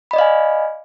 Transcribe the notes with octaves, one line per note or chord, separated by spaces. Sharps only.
D5 D#5 F5 G#5 B5